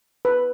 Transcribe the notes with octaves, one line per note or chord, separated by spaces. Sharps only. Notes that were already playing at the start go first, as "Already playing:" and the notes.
B4